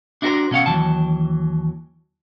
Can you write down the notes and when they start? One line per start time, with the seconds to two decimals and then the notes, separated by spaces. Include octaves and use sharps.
0.22 D4 E4 F#4 G4 A#4 C5
0.51 B2 C#4 F5 F#5
0.66 D#2 E3 F#3 A5